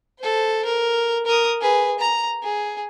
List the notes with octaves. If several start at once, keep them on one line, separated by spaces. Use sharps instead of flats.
A4 C5
A#4
A#4 D#6
G#4 B4
A#5
G#4